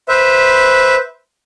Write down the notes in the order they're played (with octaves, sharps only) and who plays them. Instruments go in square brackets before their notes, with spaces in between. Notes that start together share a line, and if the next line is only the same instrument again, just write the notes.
[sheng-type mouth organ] B4 C5 E5